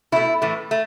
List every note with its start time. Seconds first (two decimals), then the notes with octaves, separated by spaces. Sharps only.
0.12 B2 A3 E4
0.42 A2 E3 A3
0.71 A3